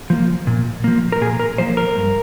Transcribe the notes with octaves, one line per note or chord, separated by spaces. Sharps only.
F3 A#3
A#2
F3 A#3
A#4
A#2 G#4
A#4
F3 A#3 C5
A#4
G2